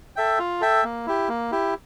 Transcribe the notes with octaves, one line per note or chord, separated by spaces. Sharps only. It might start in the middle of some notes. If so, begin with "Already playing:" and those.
A4 E5 G5
F4
A4 E5 G5
A#3
E4 G4
A#3
E4 G4